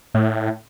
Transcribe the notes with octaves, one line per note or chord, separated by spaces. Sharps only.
A2